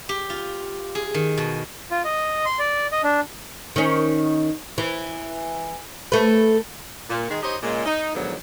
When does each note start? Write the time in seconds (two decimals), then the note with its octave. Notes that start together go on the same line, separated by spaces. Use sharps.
0.09 G4
0.30 F4
0.95 G#4
1.14 D#3
1.37 B2
1.91 F4
2.04 D#5
2.45 C6
2.59 D5
2.92 D#5
3.04 D4
3.76 D#3 C#4
4.78 E3
6.12 A3 B4
7.09 A#2
7.30 D#3 G#3
7.43 D#4 G4 C5 C#5 D#5
7.63 A#2 C#3 G#3
7.86 D#4
8.15 G#2 B2 D3 D#3 F3 F#3